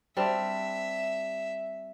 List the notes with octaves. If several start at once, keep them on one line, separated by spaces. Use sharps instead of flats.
G3 C4 D4 E5